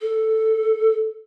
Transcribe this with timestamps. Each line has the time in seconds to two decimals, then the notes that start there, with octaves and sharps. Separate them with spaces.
0.01 A4